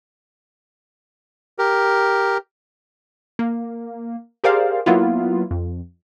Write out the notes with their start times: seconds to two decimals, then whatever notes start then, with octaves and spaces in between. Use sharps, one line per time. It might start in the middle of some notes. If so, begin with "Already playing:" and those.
1.59 G4 A#4
3.39 A#3
4.44 G4 G#4 A#4 C5 D5 F5
4.86 F#3 A#3 B3 E4 F4
5.51 F2